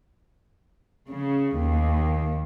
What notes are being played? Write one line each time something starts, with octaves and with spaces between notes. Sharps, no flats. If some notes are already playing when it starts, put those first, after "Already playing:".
C#3
D#2